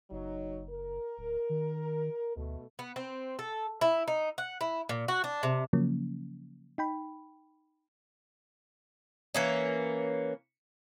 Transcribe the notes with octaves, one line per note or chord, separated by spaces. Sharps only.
F#1 F#3 D#4
A#4
D1
D#3
D2 B2 A3
B3
C4
A4
E4
D#4
F#5
E4
A#2
F#4
D4
C3
C#3 F3 F#3 A#3 C#4
D#4 G5 B5
E3 A#3 C#4